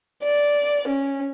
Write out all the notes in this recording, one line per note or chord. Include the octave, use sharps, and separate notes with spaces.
D5
C#4